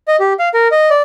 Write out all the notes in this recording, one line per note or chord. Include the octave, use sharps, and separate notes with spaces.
D#5
G4
F5
A#4
D#5
D5